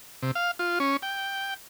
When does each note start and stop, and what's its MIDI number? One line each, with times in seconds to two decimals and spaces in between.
0.23 0.31 48
0.35 0.51 77
0.59 0.79 65
0.80 0.97 61
1.03 1.54 79